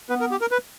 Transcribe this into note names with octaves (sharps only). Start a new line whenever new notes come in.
B3 B4
A#4
G4
A#4
B4